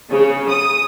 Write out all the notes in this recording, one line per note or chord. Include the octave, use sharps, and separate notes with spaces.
C#3
D#6